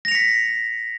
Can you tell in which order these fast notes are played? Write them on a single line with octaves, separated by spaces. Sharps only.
A#6 F7 C#7 B6